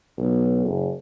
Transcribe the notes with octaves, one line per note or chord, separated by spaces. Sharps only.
B1
F#1